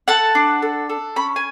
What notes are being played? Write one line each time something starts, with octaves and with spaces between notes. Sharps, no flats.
A4 F#5 A5
D4
A4
A4
C#4 B5
G#5